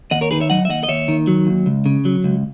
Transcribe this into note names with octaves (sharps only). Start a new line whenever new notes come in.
D#2 D#5 F#5
A#4 C#5
D#3 G#4 B4
C#5 E5
F#3 D#5 F#5
E5
D#2 D#5 F#5
D#5
D#2 C#5 E5
D#3
F#3
D#2
C#2
C#3
F#3
C#2